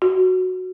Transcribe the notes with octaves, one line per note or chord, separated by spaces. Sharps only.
F#4